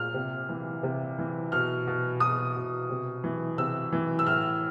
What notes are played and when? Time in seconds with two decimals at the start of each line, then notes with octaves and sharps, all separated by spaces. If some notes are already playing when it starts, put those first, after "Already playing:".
Already playing: A#2 F6
0.14 C3
0.49 E3
0.83 C3
1.19 E3
1.52 B2 F6
1.87 B2
2.20 B2 D#6
2.56 B2
2.90 C3
3.24 E3
3.58 C3 E6
3.93 E3
4.19 E6
4.27 A2 F6